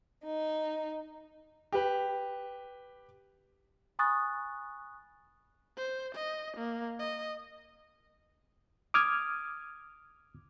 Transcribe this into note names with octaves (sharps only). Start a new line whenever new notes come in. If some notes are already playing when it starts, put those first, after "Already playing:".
D#4
G4 B4
G#5 B5 C#6 D#6 F#6 A6
C5
D#5
A#3
D#5
D6 D#6 F6 G#6